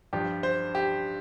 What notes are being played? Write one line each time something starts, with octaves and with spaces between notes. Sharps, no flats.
G2 F3 G4
C5
G4